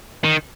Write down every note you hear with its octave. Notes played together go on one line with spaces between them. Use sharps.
D#3